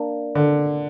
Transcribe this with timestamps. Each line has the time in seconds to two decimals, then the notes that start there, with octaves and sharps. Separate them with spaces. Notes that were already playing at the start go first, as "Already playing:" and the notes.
Already playing: A#3 D4
0.35 D3